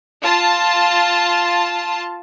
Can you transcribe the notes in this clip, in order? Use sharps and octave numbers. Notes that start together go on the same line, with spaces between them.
F4 A5